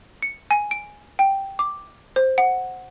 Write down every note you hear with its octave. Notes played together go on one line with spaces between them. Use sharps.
C#7
G#5
D7
G5
D6
C5
F#5